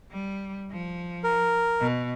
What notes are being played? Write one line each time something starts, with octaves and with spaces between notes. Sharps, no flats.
G3
F3
A#4
B2